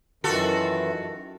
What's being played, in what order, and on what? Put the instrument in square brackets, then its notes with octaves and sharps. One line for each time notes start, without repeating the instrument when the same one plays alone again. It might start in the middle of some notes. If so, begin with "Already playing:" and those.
[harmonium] F#2 D#3 E3 [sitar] F4 F#4 A4